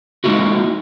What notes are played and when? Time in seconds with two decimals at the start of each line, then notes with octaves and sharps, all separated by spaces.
0.24 G#3 A#3 D#4 E4 F#4